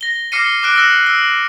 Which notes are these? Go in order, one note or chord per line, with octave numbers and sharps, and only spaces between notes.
A#6 G7
D6 F6 A#6 C7 C#7 D#7
D6 F#6 D7
E6 A#6 E7
E6